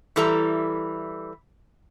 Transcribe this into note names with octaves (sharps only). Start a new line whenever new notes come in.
E3 G3 E4 A4 E5 A#5